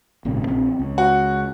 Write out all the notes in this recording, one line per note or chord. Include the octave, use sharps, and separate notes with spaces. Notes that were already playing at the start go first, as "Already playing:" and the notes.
G#1 A#2 C#3
A#1 C4
C#2
F#4